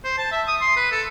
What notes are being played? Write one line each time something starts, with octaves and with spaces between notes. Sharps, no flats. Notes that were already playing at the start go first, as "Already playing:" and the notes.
C5
A5
E5
D#6
C6
B4
A4